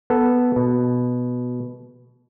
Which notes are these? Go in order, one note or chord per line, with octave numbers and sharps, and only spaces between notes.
B3 A4
B2